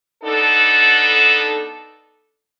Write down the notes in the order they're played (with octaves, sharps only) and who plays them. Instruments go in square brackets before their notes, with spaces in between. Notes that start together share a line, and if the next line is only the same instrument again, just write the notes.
[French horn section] B3 D4 D#4 A4